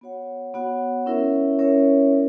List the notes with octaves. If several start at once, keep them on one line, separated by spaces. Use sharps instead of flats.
B3 F#4 C#5 F#5
B3 F#4 C#5 F#5
C#4 E4 A#4 C#5 E5
C#4 E4 A#4 C#5 E5
E4 A#4 D5